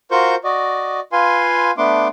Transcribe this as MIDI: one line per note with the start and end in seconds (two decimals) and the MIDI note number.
0.11 0.35 65
0.11 0.35 66
0.11 0.35 70
0.11 0.35 72
0.11 0.35 85
0.11 0.35 91
0.44 1.00 66
0.44 1.00 74
0.44 1.00 75
1.12 1.71 65
1.12 1.71 71
1.12 1.71 77
1.12 1.71 80
1.12 1.71 84
1.78 2.08 57
1.78 2.08 59
1.78 2.08 62
1.78 2.08 84
1.78 2.08 86